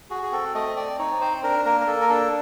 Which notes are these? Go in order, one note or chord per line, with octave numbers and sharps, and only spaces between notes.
F#4 G#4
G#4
C4 A4
A3 D#5
C4 D5
D#4 C#5
C4 C5
D4 A#4
A#3 A#4
A#4
A#3 A4
A#4
D4 A4